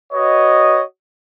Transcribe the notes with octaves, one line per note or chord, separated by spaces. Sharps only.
F#4 B4 C#5 D#5